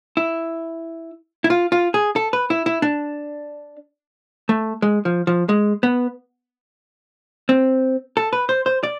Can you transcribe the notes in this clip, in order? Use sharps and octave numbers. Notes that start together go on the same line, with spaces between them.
E4
E4
F4
F4
G#4
A4
B4
E4
E4
D4
A3
G#3
F3
F3
G#3
B3
C4
A4
B4
C5
C5
D5